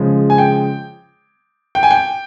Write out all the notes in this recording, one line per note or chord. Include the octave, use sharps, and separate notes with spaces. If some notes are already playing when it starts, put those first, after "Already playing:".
Already playing: C#3 F3 G#3
G#5
G5
G5
G#5
G5